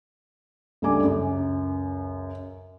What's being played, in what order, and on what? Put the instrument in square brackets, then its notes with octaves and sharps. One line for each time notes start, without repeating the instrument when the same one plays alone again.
[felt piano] C#2 G3 A3 D4 G#5 D6
C#2 F#2